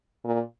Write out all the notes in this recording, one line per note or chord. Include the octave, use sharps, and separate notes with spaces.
A#2